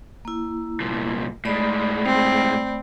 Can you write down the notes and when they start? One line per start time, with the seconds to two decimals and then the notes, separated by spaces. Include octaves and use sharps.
0.25 A#3 E4
0.80 C2 A#2
1.45 A2 G#3 A3 D5 B5
2.06 C4